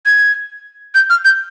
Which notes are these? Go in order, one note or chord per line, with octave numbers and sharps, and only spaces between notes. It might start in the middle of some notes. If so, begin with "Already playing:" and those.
G#6
G6
F6
G6